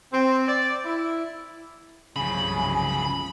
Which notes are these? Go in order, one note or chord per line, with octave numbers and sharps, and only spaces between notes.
C4
D5
E4
G1 C2 C#3 F3 F#3 G#5 B5